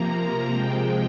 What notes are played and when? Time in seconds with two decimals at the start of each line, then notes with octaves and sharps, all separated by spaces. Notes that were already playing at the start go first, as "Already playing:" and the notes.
Already playing: C3 F3 A#3 A#5
0.50 C3 F3 G#3 G5